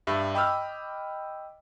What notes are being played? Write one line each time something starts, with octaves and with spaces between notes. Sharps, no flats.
G2 G3 E5
D#5 G5 B5 D6 E6 F6